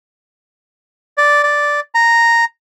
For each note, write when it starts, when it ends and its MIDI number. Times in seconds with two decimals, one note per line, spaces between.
1.18 1.43 74
1.43 1.80 74
1.95 2.45 82